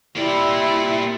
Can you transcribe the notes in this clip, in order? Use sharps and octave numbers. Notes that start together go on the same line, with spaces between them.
C3 G3 A#3 E4 D5